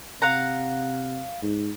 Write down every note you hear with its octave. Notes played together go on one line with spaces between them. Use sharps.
C3 F5 F#5 A#5
G#2